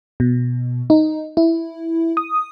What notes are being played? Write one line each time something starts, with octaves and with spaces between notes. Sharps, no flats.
B2
D#4
E4
D#6